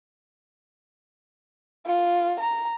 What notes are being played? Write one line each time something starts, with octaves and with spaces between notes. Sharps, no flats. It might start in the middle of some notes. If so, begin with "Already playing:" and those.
F4
A#5